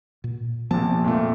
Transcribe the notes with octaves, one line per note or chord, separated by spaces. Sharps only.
A#2
A#1 C3 F3 B3 C4 A5
F2 A#2 A3